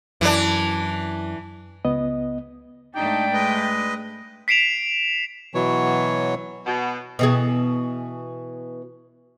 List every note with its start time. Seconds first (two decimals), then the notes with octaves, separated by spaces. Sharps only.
0.21 F#2 E3 D4
1.85 C#2 B3 D#5
2.96 G#2 A3 D4 D#4 G5
3.33 G#3 B4 D#5
4.48 B6 C7 D7 E7 F7
5.55 B2 E3 F#3 C#5
6.66 B2
7.19 B2 E3 G#4